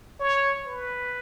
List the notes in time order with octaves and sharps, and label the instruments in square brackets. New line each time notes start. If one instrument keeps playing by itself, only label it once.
[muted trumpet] C#5
B4